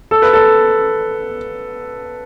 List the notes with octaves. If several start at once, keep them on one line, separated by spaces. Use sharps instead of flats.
A4
B4
A4